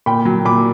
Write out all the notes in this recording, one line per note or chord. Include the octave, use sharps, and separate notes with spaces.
A#2 G5 B5
F#3
A#2 B5 D6